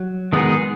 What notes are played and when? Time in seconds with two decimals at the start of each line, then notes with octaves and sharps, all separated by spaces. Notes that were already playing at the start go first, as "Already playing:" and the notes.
Already playing: F#3
0.33 D#3 G#3 B3 D#4 G#4